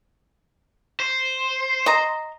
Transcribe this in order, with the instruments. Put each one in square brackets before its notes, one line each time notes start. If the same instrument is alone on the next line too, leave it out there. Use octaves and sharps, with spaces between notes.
[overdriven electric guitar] C5
[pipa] D#5 A#5